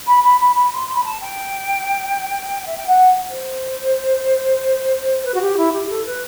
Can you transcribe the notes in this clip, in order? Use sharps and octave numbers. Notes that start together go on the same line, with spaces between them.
B5
B5
B5
B5
C6
C6
B5
A5
G5
E5
G5
F#5
C5
B4
F#4
G4
E4
G4
A4
B4